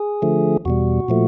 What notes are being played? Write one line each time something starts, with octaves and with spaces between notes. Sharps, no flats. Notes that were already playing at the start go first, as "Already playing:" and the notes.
Already playing: G#4
D3 F3 A3
E2 B2 G3 F#4
A#2 F3 A3